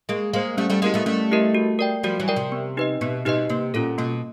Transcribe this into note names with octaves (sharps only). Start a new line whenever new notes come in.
G#3 A#3 G#4
G#3 A#3 C5 F5
G3 A3 C#4
G3 A3
G#3 A#3 E4 G4 A#4 D#5
A3 B3
G3 A3 C#4
E4 G4 A#4 D#5
F#4
A#4 D5 G5
F3 G3 F#4
E3 F#3
A#4 D5 G5
C3
B3
D#4 G4 B4 D#5
B2 B3
B2 D#4 G4 B4 D#5
C3 A#3
A#2 C#4 F4 A4
B2 A#3